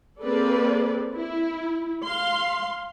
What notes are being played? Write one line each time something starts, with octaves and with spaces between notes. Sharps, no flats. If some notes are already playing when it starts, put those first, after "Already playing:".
A#3 C4 G#4 A4 B4 D5
E4
F5 C6